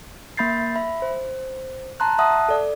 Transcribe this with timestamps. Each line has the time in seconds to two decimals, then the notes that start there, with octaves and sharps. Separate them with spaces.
0.37 A#3 E5 B5 G6 A6 C7
0.76 E5 B5
1.02 C5
2.00 A5 A#5 C6 F#6
2.19 E5 F#5 A5 D#6 F#6
2.49 A4 D5